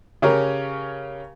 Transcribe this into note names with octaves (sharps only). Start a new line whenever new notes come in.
C#3 C#4 G4 A#4